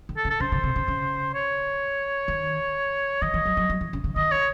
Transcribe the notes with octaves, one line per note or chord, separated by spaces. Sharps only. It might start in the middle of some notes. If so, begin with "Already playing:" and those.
D#3
A4
C#3
A4
C#3 C5
C#3
C3
C#3
C#3
C#5
D#3
D#3 D#5
E3
F#3
F#3
F#3
E3
C#3
C#3
D#3 D#5
C#5